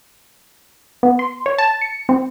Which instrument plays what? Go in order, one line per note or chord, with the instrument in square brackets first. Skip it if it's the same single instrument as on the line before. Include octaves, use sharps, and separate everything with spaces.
[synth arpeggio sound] B3
C6
C#5
A5
C#7
C4